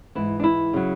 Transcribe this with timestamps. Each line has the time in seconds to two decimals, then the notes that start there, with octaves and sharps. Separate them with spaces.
0.15 G#2 E3 E4
0.40 D4
0.44 E4
0.73 C#3 F#3